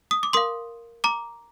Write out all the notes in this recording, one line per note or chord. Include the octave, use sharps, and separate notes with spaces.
D#6
D6
A#4 F5 C6 D#6
A#5 D6